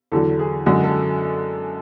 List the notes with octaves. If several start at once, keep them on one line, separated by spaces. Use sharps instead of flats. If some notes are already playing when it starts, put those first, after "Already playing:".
E2 D3 F#3 A4
G#4
F#2 D3 G#3 F#4
A4